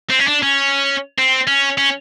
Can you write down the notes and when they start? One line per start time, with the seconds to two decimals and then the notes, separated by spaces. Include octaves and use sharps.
0.10 C4
0.19 C#4
0.27 D4
0.42 C#4
1.18 C4
1.47 C#4
1.78 C#4